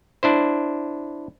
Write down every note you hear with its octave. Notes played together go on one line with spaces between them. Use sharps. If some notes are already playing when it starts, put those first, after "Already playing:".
D4 E4 C5